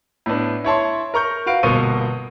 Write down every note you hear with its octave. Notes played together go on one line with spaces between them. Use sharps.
A2 B3 D4
E4 C#5 A5 C6
A#4 A#5 C#6 G6
F#4 B4 F5 D7
G1 B2 A#3 C5 C#6 D#7